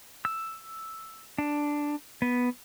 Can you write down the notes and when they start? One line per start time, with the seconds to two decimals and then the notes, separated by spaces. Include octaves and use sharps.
0.25 E6
1.38 D4
2.22 B3